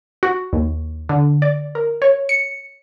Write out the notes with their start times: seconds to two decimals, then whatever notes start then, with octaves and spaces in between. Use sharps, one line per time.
0.23 F#4
0.53 D#2
1.09 D3
1.42 D5
1.75 A#4
2.02 C#5
2.29 C#7